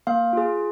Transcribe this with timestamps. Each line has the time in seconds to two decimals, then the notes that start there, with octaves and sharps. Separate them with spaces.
0.07 A#3 F5
0.33 F4 G#4